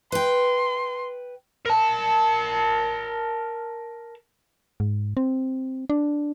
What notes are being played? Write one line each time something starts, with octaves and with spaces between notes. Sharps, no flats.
B4 G5 C6
A#4 A5
G#2
C4
D4